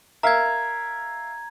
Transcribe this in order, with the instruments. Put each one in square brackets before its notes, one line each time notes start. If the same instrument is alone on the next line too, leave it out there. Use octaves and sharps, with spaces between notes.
[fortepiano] A#4 E5 F5 [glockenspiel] A#5 G#6